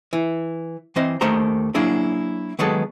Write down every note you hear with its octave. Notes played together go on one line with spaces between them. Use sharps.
E3
E3 C4 C5 D#5
D#2 D#3 A3 A#3 C5 A#5
F#3 A#3 D4 E4 G#4
D#3 F#3 G#3 B3 G#4 A4